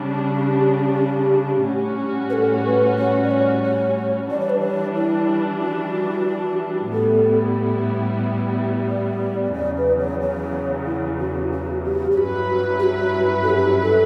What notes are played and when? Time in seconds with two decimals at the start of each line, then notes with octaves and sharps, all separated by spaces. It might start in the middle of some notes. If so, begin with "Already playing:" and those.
Already playing: C#3 G3 D4
0.36 G4
1.67 A2 G3 C#4 F#4
2.30 B4
2.33 A4
2.65 B4
2.98 C#5
3.24 D5
3.31 C#5
3.65 C#5
4.31 E3 G3 D4 D5
4.40 C#5
4.50 B4
4.60 C#5
4.96 E4
5.62 F#4
6.92 A2 G3 B3 E4 A4
8.89 D5
9.55 E2 C#3 F#3 D5
9.77 B4
10.00 C#5
10.21 C#5
10.87 E4
11.20 F#4
11.52 F#4
11.85 G4
12.11 G4
12.18 G2 F#3 C#4 E4 F#4 B4
12.79 G4
12.83 F#4
13.43 A4
13.49 G4
13.82 A4